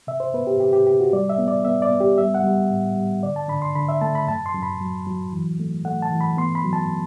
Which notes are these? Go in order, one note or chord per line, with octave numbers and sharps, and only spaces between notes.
C3 E5
C5
B3 B4
G4
C3 G4
G4
C3 G4
F#4
G3 D5
E5
B3
D5
B3 E5
D5
B3
G4
G3 E5
F#5
G3
A2
G3
D3 D5
A5
D3 B5
C6
D3 B5
E5
A3 A5
B5
F#2 A5
C6
F#2
B5
F#3
F#3
E3
A3
A3 F#5
A5
E3
B5
B3 C6
B5
F#3
A5